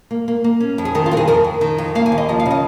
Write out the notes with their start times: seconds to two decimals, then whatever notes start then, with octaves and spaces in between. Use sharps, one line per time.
0.11 A#3
0.28 A#3
0.44 A#3
0.60 C#4
0.78 F2
0.85 G#4
0.95 D#3 A#4
1.06 F4
1.11 F2 A#4
1.17 G#4
1.28 F2 A#4
1.44 F2
1.61 D#3
1.78 F2
1.95 A#3 F5
2.06 G#5
2.12 D#2
2.18 D#5
2.29 F3 D#5
2.40 F5
2.46 C#3
2.51 D#5